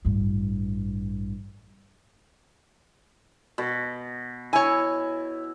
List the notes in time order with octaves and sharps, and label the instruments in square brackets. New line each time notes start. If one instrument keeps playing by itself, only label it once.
[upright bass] A1 G2
[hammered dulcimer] B2
[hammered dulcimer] E4 [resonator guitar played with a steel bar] C#5 G#5